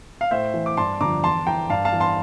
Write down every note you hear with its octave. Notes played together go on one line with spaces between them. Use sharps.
F5
A2 C5 E5
E3
D6
G2 A5 C6
D3 F3 A#5 D6
E2 A5 C6
E3 G5 A#5
G2 F5 A5
F5 A5
E3
A5 C6